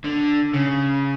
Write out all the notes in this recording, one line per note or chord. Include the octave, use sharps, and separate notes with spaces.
D3
C#3